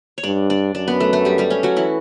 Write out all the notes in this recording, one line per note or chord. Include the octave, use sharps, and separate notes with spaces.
C#5
G2 D4 D5
D4 D5
F#2 D4 D5
B3 B4
A3 A4
A3 A4
G3 G4
G3 G4
C#4
F#3 F#4
E3 E4